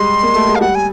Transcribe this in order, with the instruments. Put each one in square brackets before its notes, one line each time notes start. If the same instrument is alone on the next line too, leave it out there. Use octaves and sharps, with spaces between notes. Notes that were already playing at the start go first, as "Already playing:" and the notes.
Already playing: [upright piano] G3 G#3 [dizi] C6
[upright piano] A#3
A3
G#3
[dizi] F5
[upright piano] G3 [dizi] F#5
[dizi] G#5